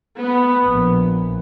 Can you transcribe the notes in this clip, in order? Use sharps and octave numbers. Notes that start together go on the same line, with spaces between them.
B3
A#1